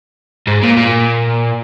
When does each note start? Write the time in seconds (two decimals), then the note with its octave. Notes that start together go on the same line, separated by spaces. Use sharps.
0.47 G#2
0.63 A#2
0.77 A#2